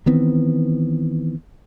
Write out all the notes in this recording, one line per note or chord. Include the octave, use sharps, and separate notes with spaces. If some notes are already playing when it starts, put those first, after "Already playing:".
D#3 E3 B3 C4